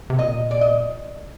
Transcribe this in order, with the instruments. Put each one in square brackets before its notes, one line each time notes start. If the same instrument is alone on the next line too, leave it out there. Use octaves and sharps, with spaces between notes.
[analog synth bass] C3
[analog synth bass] A#2 [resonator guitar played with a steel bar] D#5
[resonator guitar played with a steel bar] D5
D#5